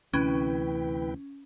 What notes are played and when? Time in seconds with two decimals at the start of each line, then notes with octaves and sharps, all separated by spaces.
0.14 D2 C3 E3 C#4 E4 B4 G5